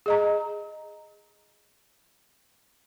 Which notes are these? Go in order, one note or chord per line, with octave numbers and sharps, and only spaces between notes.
G#4 D#5 A#5